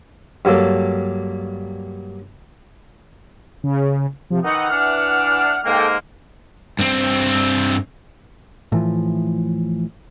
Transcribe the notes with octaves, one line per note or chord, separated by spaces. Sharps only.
G2 F#3 A#3 A4
C#3
C3 F3
D#3 E3 D#4 F#5
E3 D4 F6
G#2 G#3 A#3 A4 G5
G2 C4
A2 E3 F3